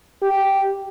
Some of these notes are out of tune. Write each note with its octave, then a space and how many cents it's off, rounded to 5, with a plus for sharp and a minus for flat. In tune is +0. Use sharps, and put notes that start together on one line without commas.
G4 -5